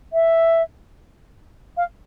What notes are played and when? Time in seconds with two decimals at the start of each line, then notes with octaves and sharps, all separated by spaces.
0.13 E5
1.77 F5